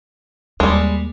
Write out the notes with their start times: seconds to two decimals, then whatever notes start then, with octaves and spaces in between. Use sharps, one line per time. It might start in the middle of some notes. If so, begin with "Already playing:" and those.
0.60 D#2 G3 G#3